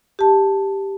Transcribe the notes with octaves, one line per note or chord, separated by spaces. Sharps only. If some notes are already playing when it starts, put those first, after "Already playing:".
G4 A5